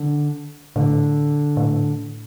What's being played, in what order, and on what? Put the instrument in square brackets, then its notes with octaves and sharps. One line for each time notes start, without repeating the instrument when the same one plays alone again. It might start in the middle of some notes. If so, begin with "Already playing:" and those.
Already playing: [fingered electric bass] D3
[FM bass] A2 [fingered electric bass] D3
[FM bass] A2